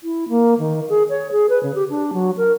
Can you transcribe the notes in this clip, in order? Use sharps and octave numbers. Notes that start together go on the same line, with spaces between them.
E4
A#3
D#3
G#4
C#5
G#4
B4
C#3
G4
D4
F#3
A#4